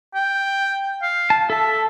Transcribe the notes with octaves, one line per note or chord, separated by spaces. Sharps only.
G5
F5
A5
A4 E5 A5